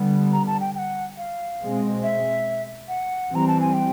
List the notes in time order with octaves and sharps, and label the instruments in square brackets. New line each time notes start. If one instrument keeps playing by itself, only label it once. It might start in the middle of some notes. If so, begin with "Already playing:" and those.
Already playing: [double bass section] D3 G3 B3
[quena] A#5
A5
G5
G5
F#5
F5
[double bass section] B2 G#3 C4
[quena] E5
F#5
[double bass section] E3 G3 C4 [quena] A#5
[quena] A5
G#5
G5